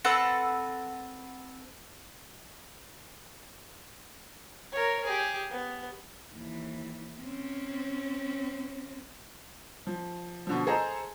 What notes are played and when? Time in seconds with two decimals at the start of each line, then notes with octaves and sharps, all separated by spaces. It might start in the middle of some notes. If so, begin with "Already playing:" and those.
0.05 C4 A4 B4 F#5
4.72 A#4 C#5
5.04 G4 G#4
5.51 B3
6.33 D#2 E3
7.20 C4 C#4
9.87 F3
10.47 B2 D3 F3
10.67 G#4 A4 C5 D#5 A#5